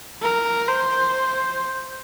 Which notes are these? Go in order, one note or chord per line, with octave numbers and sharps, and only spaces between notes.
A#4
C5